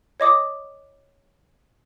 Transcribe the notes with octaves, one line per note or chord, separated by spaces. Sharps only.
C#5 D#5 D6 D#6